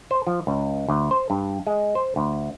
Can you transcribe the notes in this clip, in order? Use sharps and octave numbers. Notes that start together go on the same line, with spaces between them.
C5
F3
C#2
D2
C5
G2
G#3
C5
D2